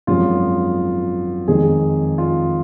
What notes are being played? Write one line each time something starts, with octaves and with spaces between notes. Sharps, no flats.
G#1 F#2 F3 G#3 F4
F2 D#3 G#3 G#4
F4